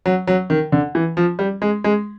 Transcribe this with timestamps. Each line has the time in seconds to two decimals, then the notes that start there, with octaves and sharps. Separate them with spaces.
0.06 F#3
0.27 F#3
0.50 D#3
0.72 D3
0.95 E3
1.17 F3
1.39 G3
1.62 G#3
1.84 G#3